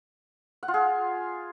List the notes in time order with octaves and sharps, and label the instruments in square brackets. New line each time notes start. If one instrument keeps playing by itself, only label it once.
[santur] F#5
F4
G#4